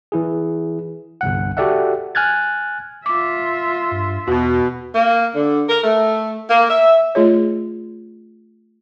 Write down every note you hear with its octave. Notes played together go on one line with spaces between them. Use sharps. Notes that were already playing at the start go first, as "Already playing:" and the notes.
E3 E4 G#4
G1 C2 F#5
F#4 G4 A4 D5 E5 F#5
G#5 F6 F#6 G#6 A6
F4 E5 D6
G2
E2 B2 F#4
A#3
D3
A#4
A3
A#3
E5
A3 F4 G#4 C#5